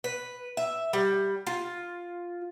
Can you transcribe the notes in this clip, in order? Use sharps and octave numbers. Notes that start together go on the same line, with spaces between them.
B4
E5
G3
F4